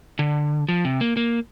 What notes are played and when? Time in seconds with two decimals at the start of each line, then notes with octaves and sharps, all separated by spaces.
0.19 D3
0.68 F3
0.85 C3
1.01 A#3
1.17 A#3